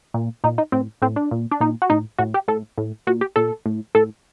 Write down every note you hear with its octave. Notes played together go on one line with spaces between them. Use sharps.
A#2
A#2 D#4
D#4
A2 C4
A2 C4
D4
A#2
D4
A#2 D#4
F#4
A2 D#4
A2 F#4
G4
A2 A4
A2
A#2 F#4
G4
A#2 A4
A2
A2 A4